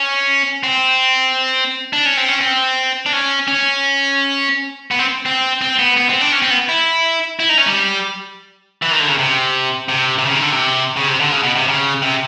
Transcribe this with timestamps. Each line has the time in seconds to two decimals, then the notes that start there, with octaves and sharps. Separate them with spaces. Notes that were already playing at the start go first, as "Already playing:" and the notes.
Already playing: C#4
0.64 C4
1.93 D4
2.06 C#4
2.17 C4
2.29 C#4
2.41 C4
3.06 D4
3.13 C#4
3.48 C#4
4.91 B3
4.99 C4
5.26 C4
5.62 C4
5.79 B3
5.97 B3
6.09 C4
6.21 D4
6.32 C#4
6.42 C4
6.51 B3
6.69 E4
7.40 E4
7.49 D#4
7.58 C#4
7.67 G3
8.82 E3
8.91 D#3
9.00 D3
9.08 C#3
9.18 C3
9.89 C3
10.19 C3
10.25 C#3
10.34 D#3
10.42 D3
10.51 C3
10.97 C#3
11.08 C3
11.20 D3
11.32 C#3
11.43 B2
11.56 C3
11.68 C#3
12.02 C3